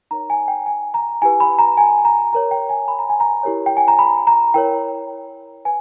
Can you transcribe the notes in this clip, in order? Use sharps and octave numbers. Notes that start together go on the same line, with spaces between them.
D#4 A#4 C#5 A#5
G#5
G5
G#5
A#5
E4 G4 B4 G#5
B5
A#5
G#5
A#5
G4 A#4 C#5 A#5
G5
G#5
B5
A#5
G#5
A#5
E4 G4 A#4 C#5
G5
G#5
A#5
B5
A#5
E4 A#4 C#5 G5
B4 G#5